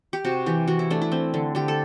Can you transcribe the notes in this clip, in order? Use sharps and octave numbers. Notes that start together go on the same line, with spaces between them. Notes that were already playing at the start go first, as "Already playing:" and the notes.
G4
C3 F#4
E3 G4
E3 F#4
E4
A3 D4
E4
C4
D3
D3 G4
A4